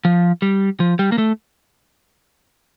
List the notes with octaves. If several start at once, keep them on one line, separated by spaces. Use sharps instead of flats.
F3
G3
F3
G3
A#3
A3